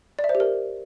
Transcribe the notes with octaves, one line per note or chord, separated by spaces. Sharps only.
D5
E5
C5
G4
A#4